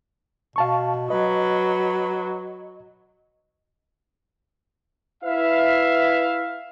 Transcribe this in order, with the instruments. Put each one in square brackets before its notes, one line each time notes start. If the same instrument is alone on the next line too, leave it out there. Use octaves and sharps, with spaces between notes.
[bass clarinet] B2 [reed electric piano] F5 A5 C#6
[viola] F#3 [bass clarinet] B4 [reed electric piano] D#5
[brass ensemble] E4 B4 E5 F5